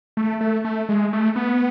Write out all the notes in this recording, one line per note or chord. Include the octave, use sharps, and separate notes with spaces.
A3
A3
A3
G#3
A3
B3